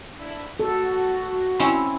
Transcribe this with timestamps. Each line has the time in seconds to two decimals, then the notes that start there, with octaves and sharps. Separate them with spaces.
0.18 D4 E4
0.60 F#4 A4
1.59 C4 C#4 E4